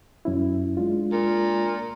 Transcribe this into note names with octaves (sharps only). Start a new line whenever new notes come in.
F#2 C#4 E4
G#3 D4 F4
A#2